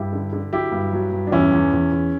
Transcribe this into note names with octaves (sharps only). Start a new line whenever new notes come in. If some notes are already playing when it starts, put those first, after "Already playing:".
Already playing: G2 E4 G4
D3
D3
F#3 E4 G4
G2
F#3
G2
D4
E2 C#4 E4
E2
E2
E2